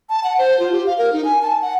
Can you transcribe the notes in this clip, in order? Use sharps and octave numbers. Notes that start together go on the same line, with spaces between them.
A5
F#5
C5
F4
G4
F5
A#4
D#4
G#5
A5
F#5